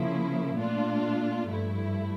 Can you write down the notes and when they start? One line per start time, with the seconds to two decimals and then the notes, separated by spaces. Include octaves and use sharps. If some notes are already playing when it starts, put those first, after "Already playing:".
Already playing: C#3 F3 A#3 E4
0.56 A#2 A3 D4 F4
1.48 G2 F3 A3 E4